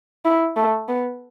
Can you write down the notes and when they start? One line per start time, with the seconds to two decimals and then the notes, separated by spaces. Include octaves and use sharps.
0.25 E4
0.56 A3
0.88 B3